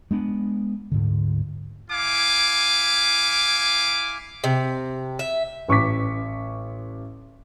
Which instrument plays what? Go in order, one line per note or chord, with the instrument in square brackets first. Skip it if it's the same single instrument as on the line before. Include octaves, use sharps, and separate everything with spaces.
[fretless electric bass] G#3 B3 D4
D2 G#2 D3
[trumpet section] E4 F5 G#5 D6
[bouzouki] C3
E5
[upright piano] A1 C#6 D6 B6